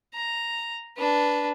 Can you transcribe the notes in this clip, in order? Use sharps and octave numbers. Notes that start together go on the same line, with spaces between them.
A#5
D4 B4